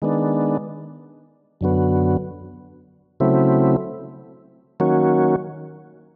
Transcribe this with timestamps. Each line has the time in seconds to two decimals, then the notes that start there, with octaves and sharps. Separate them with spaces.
0.02 D#3 G#3 B3 D4
1.61 F#2 D3 F#3 B3
3.20 C#3 F#3 A3 C4 E4
4.80 D#3 F#3 A#3 C#4 F#4